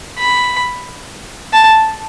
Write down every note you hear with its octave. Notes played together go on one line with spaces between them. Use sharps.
B5
A5